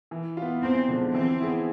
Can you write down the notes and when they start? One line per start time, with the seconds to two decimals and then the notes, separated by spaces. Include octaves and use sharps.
0.11 E3
0.37 B3 F4
0.63 E2 C4
0.88 D3 F3 G#3
1.14 E3 C4
1.40 B3 E4 G#4